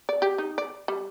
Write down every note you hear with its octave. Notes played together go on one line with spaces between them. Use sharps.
D5
G4
D#4
D5
G3